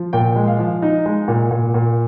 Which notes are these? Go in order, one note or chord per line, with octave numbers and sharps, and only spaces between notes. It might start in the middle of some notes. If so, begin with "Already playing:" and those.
Already playing: F3
A#2 G5
G#3
F5
F3
D#4
G#3
A#2
A#2
A#2